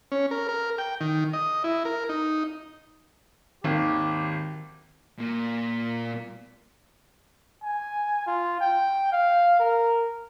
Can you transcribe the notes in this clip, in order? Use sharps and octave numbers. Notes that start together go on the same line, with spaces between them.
C#4
A#4
A#4
G5
D#3
D#5
E4
A#4
D#4
G#1 D#2 D#3 G4
A#2 A#3
G#5
F4
G5
F5
A#4